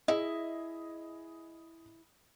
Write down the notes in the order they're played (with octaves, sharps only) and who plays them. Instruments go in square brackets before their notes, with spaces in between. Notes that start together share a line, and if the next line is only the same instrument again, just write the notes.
[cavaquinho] E4 [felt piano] G#4 D#5